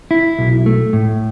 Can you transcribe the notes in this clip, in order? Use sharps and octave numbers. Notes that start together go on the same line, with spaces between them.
E4
B1
A3
A2